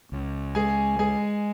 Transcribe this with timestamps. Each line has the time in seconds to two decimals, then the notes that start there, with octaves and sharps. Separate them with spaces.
0.12 C#2
0.55 G#3 G#4 G#5
0.99 G#3 G#4 G#5